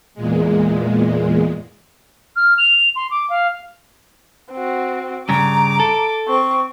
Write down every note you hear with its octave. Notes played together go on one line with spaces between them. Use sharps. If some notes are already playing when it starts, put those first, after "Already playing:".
E2 A#2 G#3
F6
F7
C6
D6
F5
C4 F#4
G2 C#3 A#5 D6
A4
C4 C#6